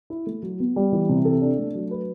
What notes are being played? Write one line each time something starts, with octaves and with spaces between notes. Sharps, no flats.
E4
A3
F#3
B3
G3
E3
C3
A4
D4
A3
F#3
B4